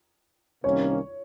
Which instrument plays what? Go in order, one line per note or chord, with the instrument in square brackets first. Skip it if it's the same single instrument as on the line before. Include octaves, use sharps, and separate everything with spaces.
[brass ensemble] C2 C3 D#3 A#3 C#4 [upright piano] C#5